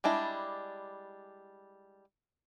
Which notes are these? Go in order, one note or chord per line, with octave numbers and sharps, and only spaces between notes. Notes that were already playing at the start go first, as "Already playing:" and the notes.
G3 G#3 D4 E4